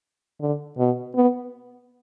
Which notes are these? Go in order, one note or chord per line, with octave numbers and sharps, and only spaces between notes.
D3
B2
B3